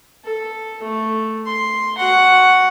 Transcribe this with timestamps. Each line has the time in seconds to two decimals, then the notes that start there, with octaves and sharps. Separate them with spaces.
0.24 A4
0.83 A3
1.46 C6
1.98 F#4 F#5